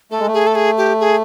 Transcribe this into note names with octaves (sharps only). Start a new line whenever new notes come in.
A3 A4
G#3
A3
G#4
A4
G#4
G4
G#4